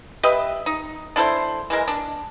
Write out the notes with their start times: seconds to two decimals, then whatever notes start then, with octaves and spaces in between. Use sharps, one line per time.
0.23 G4 B4 D#5 E5
0.66 D#4
1.16 D4 E4 A4 C5
1.70 E3 G#3 A#4
1.88 D4